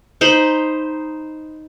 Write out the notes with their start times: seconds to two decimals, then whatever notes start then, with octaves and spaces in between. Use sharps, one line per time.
0.21 D#4 C5 B5